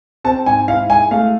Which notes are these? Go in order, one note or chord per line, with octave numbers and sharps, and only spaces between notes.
C4 A5
G#2 G#5
E4 F5
G#3 G#5
A3 F5